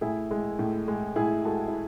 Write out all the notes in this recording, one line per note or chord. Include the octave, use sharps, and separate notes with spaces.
A2 E4 G#4
G#3
A2
G#3
A2 E4 G#4
G#3 F#4 A4
E4